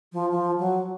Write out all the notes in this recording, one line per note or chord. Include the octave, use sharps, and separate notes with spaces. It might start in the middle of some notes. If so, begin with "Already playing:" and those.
F3
F3
F#3